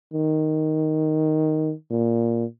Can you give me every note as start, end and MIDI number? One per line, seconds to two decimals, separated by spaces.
0.14 1.73 51
1.91 2.45 46